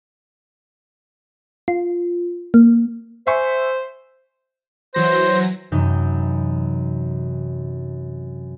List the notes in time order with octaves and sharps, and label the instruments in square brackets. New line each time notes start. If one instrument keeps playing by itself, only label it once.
[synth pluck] F4
A#3
[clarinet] C5 [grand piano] E5 G#5 C#6
[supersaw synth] E3 F#3 A#6 [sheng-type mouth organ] C5
[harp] F#2 C3 E3 D#4 G6